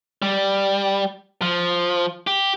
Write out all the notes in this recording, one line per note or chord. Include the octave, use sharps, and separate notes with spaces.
G3
F3
G4